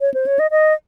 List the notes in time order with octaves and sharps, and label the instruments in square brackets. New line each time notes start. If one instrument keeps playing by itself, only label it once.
[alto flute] C#5
C5
C#5
D#5
D#5